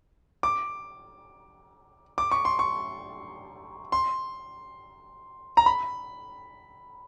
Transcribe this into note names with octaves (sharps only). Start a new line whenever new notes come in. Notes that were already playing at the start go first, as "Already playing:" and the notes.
D6
D6
C#6
C6
C#6
C6
A#5
B5